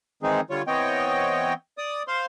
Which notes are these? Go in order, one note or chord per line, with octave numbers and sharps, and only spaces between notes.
D#3 E3 G#3 C4 D#4 G#4
D3 G3 F4 C#5
E3 B3 C4 C#5 D#5 G5
D5 D#6
C5 F5 C6